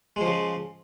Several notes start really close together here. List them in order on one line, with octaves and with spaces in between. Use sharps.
G#3 F3 C#3